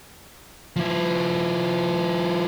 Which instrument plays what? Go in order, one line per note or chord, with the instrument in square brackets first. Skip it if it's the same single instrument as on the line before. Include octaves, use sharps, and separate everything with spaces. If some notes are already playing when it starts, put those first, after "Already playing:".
[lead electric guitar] F3 E4